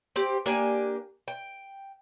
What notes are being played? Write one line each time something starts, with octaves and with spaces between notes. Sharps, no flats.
C4 G4
A#3 D4 G4 G#5
G5